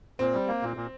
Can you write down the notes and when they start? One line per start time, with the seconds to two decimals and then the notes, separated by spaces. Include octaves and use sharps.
0.19 A#2 C4
0.34 G3
0.48 A#3
0.62 A#2
0.77 A#2